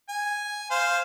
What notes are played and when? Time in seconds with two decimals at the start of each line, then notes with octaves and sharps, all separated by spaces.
0.09 G#5
0.71 C5 F5